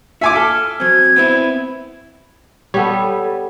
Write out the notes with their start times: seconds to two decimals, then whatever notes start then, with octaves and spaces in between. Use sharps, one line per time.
0.21 F4 F#4 E5 G#5 D6
0.36 A4 F6
0.80 F#3 C4 G#6
1.16 B3 C4 E4
2.74 G3 B3 A4 C#5